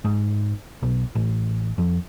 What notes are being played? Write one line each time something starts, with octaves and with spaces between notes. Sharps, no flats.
G#2
B1
A1
F2